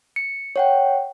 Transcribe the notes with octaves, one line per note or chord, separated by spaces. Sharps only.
C#7
C#5 F#5 G5